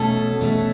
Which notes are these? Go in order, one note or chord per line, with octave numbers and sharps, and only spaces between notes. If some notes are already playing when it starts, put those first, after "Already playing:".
Already playing: B2 A3 C#4 A4
B2 A3 C#4